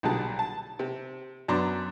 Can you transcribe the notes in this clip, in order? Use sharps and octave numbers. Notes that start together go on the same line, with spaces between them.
B1 A#2 D3 G3 G#4 A5
A5
C3
F#2 B3 D4 A#5 C6 D6